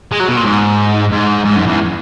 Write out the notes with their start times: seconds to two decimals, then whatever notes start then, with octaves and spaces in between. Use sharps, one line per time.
0.12 G#3
0.20 F#3
0.28 B2
0.37 A#2
0.45 G#2
1.12 G#2
1.45 G#2
1.56 F#2
1.67 E2